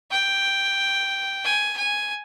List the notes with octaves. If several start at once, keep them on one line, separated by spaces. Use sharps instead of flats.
G5
G#5
G#5